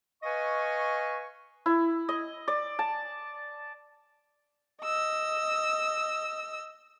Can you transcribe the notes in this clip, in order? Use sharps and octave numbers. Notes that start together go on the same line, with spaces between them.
B4 D#5 F5 G#5 C#6
E4
D#5
D5
A5
D#5 E6